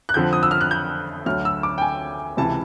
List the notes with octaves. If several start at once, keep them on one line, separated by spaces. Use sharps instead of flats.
F#6
F2 D3 F3 G6
D#6
E6
F6
F#6
G6
D2 D3 F#3 F6
E6
D6
G5
G#5
C#2 C3 E3 A5